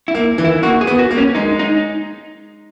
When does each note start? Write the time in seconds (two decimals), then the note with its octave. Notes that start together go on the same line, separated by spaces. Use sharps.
0.08 E4
0.15 A#3
0.38 E3
0.45 E4
0.63 A#3 F#4
0.81 G#4
0.87 B3
0.99 F#4
1.11 A#3
1.18 C#4
1.35 G#3 D#4
1.59 D#4